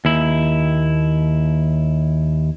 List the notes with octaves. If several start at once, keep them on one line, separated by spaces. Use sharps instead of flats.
D#2 E4